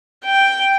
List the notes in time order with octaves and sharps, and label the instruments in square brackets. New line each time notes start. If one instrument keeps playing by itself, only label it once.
[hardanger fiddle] G5